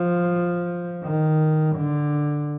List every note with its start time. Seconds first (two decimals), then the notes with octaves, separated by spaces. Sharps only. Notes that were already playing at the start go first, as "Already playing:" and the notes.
Already playing: F3
1.04 D#3
1.76 D3